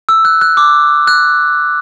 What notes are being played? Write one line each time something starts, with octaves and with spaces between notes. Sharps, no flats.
E6
F#6
F#6
D6
F#6